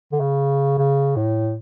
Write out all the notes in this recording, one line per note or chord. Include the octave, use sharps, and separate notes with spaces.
D3
C#3
C#3
A2